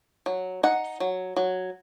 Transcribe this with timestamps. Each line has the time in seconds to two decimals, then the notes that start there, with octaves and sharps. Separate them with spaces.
0.26 F#3
0.63 D#4 F#5
1.00 F#3
1.36 F#3